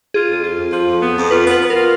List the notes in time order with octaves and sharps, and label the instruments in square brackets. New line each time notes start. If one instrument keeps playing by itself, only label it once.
[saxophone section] F4 [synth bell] G#4
[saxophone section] F2
F4
F2
F3
F2
B3
F2
[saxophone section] F4 [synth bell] B4
[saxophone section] B3
[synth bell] B4
[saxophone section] B3
[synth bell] A#4
[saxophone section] F4